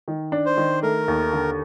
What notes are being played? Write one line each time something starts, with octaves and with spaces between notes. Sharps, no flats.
D#3
D4
C5
D#3
A3 A#4
D#2
D3